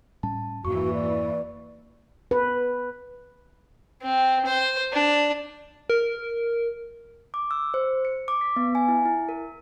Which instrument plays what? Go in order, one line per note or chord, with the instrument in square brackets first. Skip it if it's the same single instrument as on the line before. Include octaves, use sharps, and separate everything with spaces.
[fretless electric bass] A2 G3 C#4 [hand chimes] A5
[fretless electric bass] F2 G#2 [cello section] E3 A#3 [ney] F#4 [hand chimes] C#6
[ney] D5
[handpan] B4
[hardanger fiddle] C4
C5
D4
[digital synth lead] A#4
[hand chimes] D6
E6
C5
C#7
D6
B6
B3
G#5
E4
E4
A#4